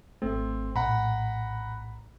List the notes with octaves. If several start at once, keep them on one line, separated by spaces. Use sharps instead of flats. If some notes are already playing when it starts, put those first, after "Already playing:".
G#1 A3 C4
A#1 A2 F#5 A#5 B5